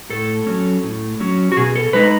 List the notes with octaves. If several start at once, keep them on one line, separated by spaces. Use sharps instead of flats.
A2 A4
F#3 C#4
A2
F#3 C#4
F#4
B2 G#4
A4
G#3 D#4 B4